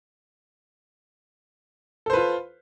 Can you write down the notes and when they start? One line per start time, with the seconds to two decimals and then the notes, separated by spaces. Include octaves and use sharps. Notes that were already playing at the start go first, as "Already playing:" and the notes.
2.06 A4
2.10 C5
2.13 B4
2.17 F4